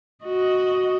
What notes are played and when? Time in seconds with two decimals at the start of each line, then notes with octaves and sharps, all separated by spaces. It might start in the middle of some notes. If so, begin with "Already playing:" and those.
0.24 F#4 D#5